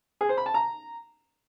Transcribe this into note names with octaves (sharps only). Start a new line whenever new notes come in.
G#4
C5
B5
A5
A#5